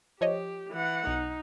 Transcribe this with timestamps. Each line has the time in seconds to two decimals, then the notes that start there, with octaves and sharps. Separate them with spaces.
0.21 F3 G4 C#5 D#5
0.72 E3 F#5
1.07 B1 D#4